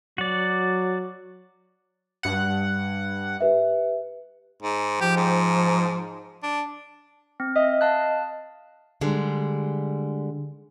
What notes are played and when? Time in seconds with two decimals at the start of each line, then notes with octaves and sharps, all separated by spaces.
0.18 F#3 F#4 D5
2.23 G2 F#5
3.41 G4 B4 E5
4.62 G#2
5.01 F3 G4
5.16 G#2
6.43 D4
7.40 C4
7.56 D#5 E5
7.81 F5 A5 F#6
9.01 D3 G3 G#3